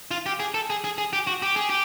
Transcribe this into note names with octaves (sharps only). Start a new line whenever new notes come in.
F4
G4
G#4
A4
G#4
G#4
G#4
G4
F#4
G4
G#4
G4